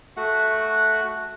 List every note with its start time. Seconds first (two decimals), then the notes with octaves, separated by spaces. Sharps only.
0.17 A3 F#4 F#5